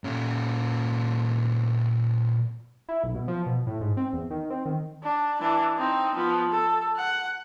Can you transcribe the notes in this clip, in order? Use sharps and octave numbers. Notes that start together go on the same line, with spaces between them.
A#2 C#4
E4
B1
B2
F3
B2
A2
G#2
C4
E2
D#3
C4
D#3
D4
E3 D4
C4 D#4
F3 B3
A4
F#5